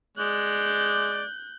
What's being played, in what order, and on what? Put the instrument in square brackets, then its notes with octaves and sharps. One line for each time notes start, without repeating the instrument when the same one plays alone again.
[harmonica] G#3 D5 [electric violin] F#6 G6